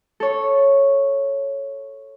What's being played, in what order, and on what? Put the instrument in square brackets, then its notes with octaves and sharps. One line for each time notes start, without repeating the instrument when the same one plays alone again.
[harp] A4 C#5